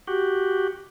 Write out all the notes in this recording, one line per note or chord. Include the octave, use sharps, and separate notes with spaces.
F#4 G4